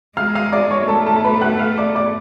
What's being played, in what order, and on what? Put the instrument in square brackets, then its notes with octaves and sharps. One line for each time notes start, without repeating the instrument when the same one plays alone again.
[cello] G#3 [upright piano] F5 F6
[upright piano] F5 F6
D5 D6
C#5 C#6
[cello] A3 [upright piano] A4 A5
[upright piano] A4 A5
A5
B4 B5
F#5 F#6
F5 F6
D5 D6
D5 D6